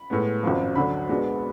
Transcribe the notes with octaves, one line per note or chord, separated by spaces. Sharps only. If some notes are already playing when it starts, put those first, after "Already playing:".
Already playing: B5
A2 G#3 B3
G#1 F#2 F3
D2 D3 F#3 B5
B1 B2 G#3 B3 D4